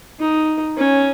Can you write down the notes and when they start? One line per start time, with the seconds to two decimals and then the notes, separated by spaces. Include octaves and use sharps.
0.20 D#4
0.77 C#4